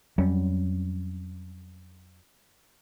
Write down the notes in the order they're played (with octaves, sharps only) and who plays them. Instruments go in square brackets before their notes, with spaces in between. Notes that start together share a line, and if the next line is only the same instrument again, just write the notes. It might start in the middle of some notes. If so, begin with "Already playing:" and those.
[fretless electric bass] F2 F#3 G3 C#4